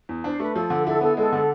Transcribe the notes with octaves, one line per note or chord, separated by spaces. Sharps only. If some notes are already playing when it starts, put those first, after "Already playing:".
E2
D4 C5
A3 B4
F3 A4
D3
E4 A4
B3 A4
G#3 A4
D3